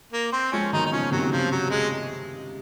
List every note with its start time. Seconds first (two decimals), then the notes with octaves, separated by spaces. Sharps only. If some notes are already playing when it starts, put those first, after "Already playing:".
0.13 A#3
0.32 C4
0.52 F3 G#3 C#4
0.73 D#3 F#3 D#4
0.86 D#4
0.92 C#3 F3 C#4
1.12 C3 D#3 F#3
1.23 C#3
1.31 C3 F3
1.52 F#3
1.71 G#3